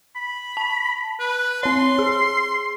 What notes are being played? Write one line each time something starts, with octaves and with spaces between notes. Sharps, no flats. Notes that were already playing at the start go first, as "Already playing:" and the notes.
B5
A5
B4
C4 C#5 C6
G#4